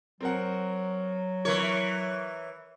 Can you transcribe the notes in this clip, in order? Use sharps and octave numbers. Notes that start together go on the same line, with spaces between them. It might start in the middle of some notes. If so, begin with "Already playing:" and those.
F#3 C4 A#4 F#5
E3 A#4 C#5 C#6